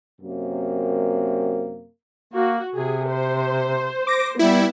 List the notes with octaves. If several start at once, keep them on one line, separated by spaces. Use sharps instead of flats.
F#2 C3 A#3
A#3 F#4
C3 G#4
C5
D6 A#6
G3 B3 E4